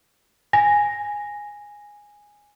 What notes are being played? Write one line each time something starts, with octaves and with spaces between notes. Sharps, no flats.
G#5 A#6